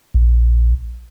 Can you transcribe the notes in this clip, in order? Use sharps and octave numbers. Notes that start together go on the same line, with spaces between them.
A#1